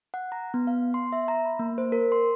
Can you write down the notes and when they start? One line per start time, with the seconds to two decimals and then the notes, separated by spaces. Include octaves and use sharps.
0.14 F#5
0.32 A#5
0.54 B3
0.67 F5
0.94 C6
1.12 E5
1.28 A#5
1.45 B5
1.59 A#3
1.78 C5
1.92 A#4
2.12 C6